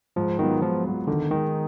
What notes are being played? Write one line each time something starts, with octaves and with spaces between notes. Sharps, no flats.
G#2 F3
D#3 F#3 B3 F4
G#2 F3
F#3 B3 F4
D3 D#3
D#3 G#3 D#4